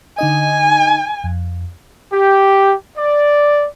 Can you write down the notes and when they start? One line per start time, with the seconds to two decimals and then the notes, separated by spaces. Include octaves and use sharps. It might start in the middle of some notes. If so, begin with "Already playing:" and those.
0.18 D3 D#4 D#5 G#5
1.24 F2
2.12 G4
2.97 D5